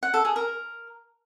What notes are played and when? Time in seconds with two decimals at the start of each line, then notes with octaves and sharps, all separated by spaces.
0.03 F#5
0.14 A4
0.25 G#4
0.36 A#4